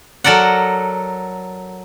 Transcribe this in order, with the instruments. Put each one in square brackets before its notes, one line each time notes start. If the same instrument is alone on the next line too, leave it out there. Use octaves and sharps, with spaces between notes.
[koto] F#3 A4 A#4 D5 F#5